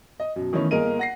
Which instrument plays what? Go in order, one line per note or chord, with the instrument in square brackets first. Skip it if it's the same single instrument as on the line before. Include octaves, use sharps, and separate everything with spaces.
[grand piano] D#5
F#2 B2
D#3 E3 A3 B3 C#4 E4
G1 A#3 G#4 A#4 D#5 D#7
F#5 A#6 C7